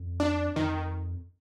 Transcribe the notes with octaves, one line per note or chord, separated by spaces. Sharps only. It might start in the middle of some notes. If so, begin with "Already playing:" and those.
Already playing: F2
D4
F2 D#3